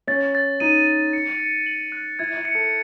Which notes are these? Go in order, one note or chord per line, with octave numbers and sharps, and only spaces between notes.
C#4 A6
A6
D#4 D#7
D#7
C#7
C#7
F#7
F#6
E4 G#6
E4
C#7
A4